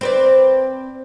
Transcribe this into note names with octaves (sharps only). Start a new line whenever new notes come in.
C4 B4 D5